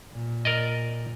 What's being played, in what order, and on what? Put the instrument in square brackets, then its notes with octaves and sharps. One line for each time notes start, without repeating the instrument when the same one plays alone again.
[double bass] A#2
[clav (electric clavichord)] A#4 D5 D#5